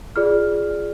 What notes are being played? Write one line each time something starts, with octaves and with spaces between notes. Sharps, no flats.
F4 G#4 D5 F6